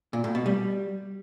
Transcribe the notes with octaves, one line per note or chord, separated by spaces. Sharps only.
A#2
A2
B2
G3